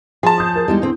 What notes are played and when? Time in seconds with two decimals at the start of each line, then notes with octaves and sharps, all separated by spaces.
0.23 F3 G#4 A5
0.38 D#6 G6
0.56 A#4
0.68 E2 G3 G#3 D#4
0.82 D3 C4